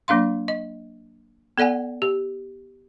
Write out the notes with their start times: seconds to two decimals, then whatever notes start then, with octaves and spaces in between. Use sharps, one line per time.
0.08 F#3 A#3 D4 F5 C6
0.48 D#5
1.58 B3 A4 D5 F#5 G#5
2.02 G4